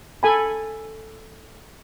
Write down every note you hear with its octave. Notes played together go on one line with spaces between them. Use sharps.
A4 G#5 B5